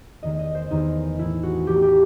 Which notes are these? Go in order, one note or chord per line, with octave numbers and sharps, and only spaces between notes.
E2 D#3 A3 D#5
D#5
C5
E2 D#3 A3 D#4
A2 E3 A3 E4
F#4
A2 E3 A3 G4
G4